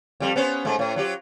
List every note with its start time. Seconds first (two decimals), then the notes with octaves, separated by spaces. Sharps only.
0.20 F2 G3
0.36 B3 C#4 C5
0.65 G#2 A3
0.79 A2
0.96 F#3 F4 G4